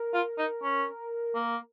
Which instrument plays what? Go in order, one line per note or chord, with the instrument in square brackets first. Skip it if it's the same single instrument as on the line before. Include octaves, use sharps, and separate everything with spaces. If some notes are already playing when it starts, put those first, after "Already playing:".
Already playing: [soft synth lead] A#4
[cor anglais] F4
D#4
C#4
A#3